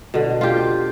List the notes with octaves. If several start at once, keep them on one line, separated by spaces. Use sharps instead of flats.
B2 D3
F4 G4